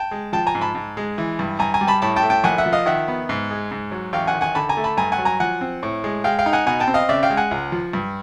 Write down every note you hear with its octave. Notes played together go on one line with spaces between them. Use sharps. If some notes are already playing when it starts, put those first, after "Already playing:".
Already playing: G5 A5
G#3
F3 G5 A5
G#5 A#5
G#2
A5 B5
G#2
G#3
E3
G2
G2 G#5 A#5
G#5 A#5
G3
A5 B5
A2 A5 B5
G5 A5
A3
G5 A5
A#1 F#5 G#5
E5 F#5
F3
D#5 F5
D#3 E5 F#5
B3
G#2
G#3
G#2
F#3
A1 F5 G5
F#5 G#5
D#3
F#5 G#5
D3 A5 B5
G#5 A#5
A3
A5 B5
G2 G#5 A#5
F#5 G#5
F#3
G#5 A#5
F3 F#5 G#5
C4
A2
G#3
G#3 F5 G5
F5 G5
D#4
F#5 G#5
B2 F#5 G#5
G5 A5
C4
D#5 F5
C#3 D5 E5
F5 G5
G#3
F#5 G#5
C#2
F3
G2